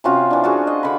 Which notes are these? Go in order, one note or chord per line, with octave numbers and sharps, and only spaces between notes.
C3 C#4 F4 F#4
E3 D4
F4 F#4 G#4
D#5
D3 B5